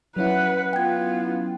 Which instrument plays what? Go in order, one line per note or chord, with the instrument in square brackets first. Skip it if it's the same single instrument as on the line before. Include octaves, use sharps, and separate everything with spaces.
[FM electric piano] F#3 C#4 E4 [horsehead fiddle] B4 F#5
[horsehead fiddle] B3 F4 [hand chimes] G5 G#6